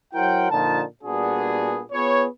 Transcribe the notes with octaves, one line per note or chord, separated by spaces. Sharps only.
F#3 E4 A#4 C5 F#5 G5
A#2 D3 F3 D#4 A5
A#2 G3 B3 D4 F#4 G#4
B3 F4 G#4 B4 C#5